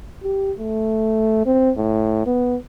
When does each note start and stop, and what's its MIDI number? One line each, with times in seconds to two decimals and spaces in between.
0.23 0.52 67
0.58 1.41 57
1.46 1.71 60
1.77 2.22 45
2.26 2.56 59